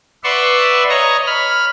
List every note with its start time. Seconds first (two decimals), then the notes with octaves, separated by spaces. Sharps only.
0.24 B4 D5 E5 F#5 C6 C#6
0.89 C#5 D#5 A#5 C#6
1.26 B5 F6